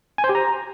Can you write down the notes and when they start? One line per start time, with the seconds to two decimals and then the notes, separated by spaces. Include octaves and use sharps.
0.18 G#5
0.24 C5
0.29 G4
0.35 A#5